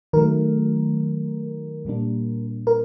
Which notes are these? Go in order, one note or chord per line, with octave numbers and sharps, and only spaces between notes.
D#3 F#3 A3 A#4
A#2 G3 A#3 D4
A#4